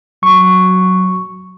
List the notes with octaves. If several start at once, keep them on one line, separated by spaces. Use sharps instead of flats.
F#3 C#6